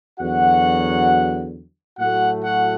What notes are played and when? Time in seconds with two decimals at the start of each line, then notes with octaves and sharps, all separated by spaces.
0.20 E2 D3 F#3 F#4 F#5
1.99 A2 F#3 A3 F#4 F#5
2.44 F#4 F#5